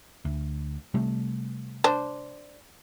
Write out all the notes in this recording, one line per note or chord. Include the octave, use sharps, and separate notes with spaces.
D2
C3 G3 A3
D4 C5